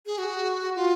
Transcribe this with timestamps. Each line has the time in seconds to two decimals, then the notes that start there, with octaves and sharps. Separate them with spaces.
0.06 G#4
0.18 F#4
0.76 F4